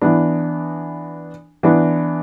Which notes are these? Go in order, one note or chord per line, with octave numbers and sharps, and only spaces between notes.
E3 B3 D4
E3 B3 D4